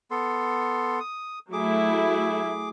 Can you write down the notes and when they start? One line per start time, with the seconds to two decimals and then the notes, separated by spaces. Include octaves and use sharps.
0.11 B3 A4 C6
1.00 D#6
1.53 F#3 A3 E4 G#4 D6